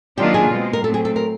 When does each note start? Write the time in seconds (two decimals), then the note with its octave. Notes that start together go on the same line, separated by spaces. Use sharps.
0.18 D#3 F#3 A#3 D4 F4 G4
0.34 G#4
0.50 B2 G#3 C4
0.73 A#4
0.84 A2 F#3 A3 C4 A4
0.94 G#4
1.05 A4
1.16 A#4